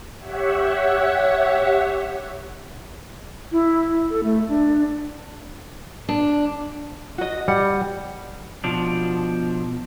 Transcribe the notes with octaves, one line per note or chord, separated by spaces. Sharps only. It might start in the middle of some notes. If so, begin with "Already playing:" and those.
G4 C#5 E5 F#5
E4
A4
A3
D4
D4
F#4 D#5
G3 F#5
B2 F3 D4